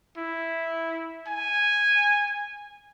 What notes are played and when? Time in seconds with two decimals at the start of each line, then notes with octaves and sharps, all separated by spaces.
0.17 E4
1.28 G#5